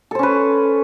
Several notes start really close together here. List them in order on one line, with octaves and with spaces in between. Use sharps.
A4 C5 C#4 B4